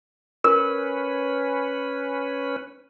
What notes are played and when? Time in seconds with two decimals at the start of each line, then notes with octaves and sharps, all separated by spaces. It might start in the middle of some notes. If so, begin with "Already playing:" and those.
0.44 C#4 A#4 B4